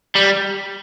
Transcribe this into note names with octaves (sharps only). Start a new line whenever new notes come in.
G3